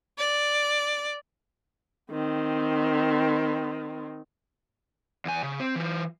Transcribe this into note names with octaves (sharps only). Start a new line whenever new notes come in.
D5
D#3 C4
E2 G#5
C#3
C4
E3 F4